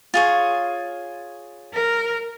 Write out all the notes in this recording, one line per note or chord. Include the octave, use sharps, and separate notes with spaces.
F4 G#4 C#5
A#4